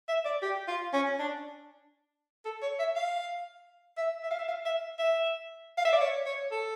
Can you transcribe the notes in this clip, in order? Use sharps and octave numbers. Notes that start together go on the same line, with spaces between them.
E5
D5
G4
F4
C#4
D4
A4
C#5
E5
F5
E5
E5
F5
E5
F5
E5
E5
F5
E5
D5
C#5
C#5
A4